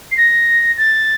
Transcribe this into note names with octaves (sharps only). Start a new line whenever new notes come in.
C7
A#6
A6